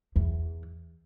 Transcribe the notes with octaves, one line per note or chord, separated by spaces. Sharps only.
E2